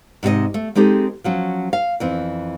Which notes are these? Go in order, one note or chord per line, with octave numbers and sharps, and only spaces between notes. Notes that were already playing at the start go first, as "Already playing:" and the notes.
G#2 C3 G4 D#5
A3
G#3 C4 D#4 G4 A4
F3 F#3 C#4
F5
F2 E3 C4